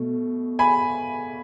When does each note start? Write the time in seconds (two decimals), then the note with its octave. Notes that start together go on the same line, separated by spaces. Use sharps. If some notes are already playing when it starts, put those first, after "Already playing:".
Already playing: B2 A3
0.59 G#5 B5